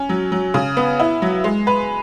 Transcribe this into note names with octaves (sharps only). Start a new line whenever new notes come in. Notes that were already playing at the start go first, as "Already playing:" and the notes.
Already playing: C#4
F#3
F#3
C#3
B3
E4
F#3
G#3
B4